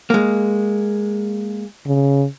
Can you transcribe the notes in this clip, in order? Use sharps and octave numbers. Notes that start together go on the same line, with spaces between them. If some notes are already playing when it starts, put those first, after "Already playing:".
G#3 A#3
C#3